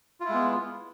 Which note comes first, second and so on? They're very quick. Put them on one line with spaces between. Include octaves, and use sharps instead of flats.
F4 E4 G#3 B3